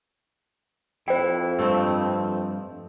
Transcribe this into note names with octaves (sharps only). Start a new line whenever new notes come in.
F2 E4 C5 G5
G2 F3 A3 C4